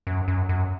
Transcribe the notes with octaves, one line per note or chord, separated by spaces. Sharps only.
F#2
F#2
F#2